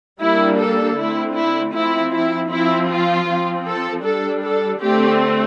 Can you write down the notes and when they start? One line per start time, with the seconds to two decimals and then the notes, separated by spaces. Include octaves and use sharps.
0.20 G3 A#3 D4 E4
0.59 A4
0.97 D3 A3 C4 E4
1.35 E4
1.74 F3 C4 E4
2.13 E4
2.50 F3 C4 E4
2.89 F4
3.28 F3 C4
3.66 A4
4.04 G3 D4 A4
4.43 A4
4.81 D3 A3 C4 G4